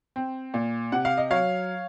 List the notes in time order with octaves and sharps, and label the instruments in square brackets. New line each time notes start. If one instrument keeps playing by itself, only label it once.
[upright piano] C4
A#2
C3 F#5
F5
D#5
F#3 C#5 F5